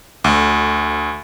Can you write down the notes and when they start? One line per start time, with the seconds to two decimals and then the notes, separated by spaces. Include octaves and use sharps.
0.24 D2